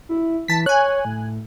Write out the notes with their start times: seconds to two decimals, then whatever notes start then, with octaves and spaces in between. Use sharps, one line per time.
0.09 E4
0.48 E3 A5 B6
0.66 C#5 G#5 F#6
1.05 A2